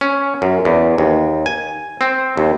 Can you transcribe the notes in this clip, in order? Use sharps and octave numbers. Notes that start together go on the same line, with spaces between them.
C#4
F#2
E2
D#2
G#5
C4
D#2